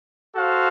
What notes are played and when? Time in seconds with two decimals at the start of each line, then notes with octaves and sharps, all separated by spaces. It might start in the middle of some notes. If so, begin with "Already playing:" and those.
0.36 F#4 A4 C5 F5